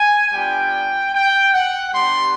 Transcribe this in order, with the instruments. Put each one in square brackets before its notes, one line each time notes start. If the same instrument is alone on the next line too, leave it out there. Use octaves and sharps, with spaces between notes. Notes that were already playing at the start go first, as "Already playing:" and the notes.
Already playing: [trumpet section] G#5
G3 B3 D4 F4 G5
G5
F#5
G3 B3 D4 G4 C6